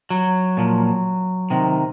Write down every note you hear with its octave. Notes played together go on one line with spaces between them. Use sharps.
F#3
A#2 F3
C3 D#3